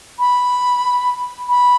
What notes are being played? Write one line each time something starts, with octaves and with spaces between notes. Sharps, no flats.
B5
B5